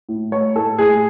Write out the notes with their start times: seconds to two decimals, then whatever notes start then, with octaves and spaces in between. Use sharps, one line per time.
0.09 A2
0.31 A3 C#5
0.55 A2 A4
0.78 A2 G#4